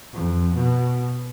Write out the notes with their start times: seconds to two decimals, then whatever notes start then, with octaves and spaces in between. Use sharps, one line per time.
0.13 F2
0.54 B2